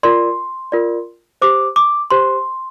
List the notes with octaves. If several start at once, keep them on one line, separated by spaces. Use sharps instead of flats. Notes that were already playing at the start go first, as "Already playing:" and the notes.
F4 A#4 D5 C6
F4 A#4 D5
G4 C5 D6
D6
G4 C5 C6